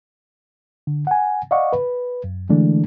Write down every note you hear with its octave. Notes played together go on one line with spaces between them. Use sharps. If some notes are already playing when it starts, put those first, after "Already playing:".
D3
F#5 G#5
D5 D#5 F5 F#5 C#6
B4
F#2
D3 E3 G#3 A3 D4